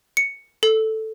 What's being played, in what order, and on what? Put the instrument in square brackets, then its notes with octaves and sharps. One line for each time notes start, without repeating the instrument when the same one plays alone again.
[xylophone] C#7
A4